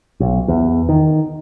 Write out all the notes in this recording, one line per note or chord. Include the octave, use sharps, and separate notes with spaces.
B1
E2
D#3